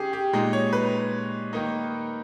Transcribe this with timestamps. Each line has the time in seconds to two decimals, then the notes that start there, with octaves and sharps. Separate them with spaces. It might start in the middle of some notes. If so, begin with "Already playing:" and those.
Already playing: D#3 C#4 G4 G#4
0.13 G4
0.33 A#2 G#3 D#4
0.53 C#5
0.73 B4
1.53 D#3 A#3 D#4